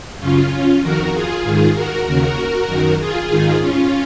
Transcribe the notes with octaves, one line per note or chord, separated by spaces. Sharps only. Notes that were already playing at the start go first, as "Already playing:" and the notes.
F#2 C#3 C#4 F4
F2 D#3 F#4 A#4
F4 G#4
G#2 D#3
F#4 A#4
D#2 C#3 F#4 A#4
F#2 D#3
F4 G#4
G#2 D#3
C#4 F4